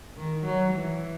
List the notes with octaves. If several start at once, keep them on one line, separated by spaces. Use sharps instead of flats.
D#3
F#3
E3